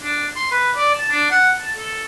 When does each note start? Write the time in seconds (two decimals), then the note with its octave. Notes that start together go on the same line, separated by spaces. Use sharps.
0.02 D4
0.36 C6
0.51 B4
0.76 D5
0.93 A5
1.10 D4
1.30 F#5
1.60 A5
1.77 A4